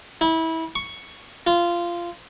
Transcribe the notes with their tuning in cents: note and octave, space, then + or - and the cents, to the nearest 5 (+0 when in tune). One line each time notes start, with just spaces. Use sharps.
E4 -25
C#6 +5
F4 -15